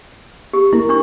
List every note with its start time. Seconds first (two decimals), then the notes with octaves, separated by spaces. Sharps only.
0.53 G4
0.73 A#3 E4 A#4
0.89 D4 C#6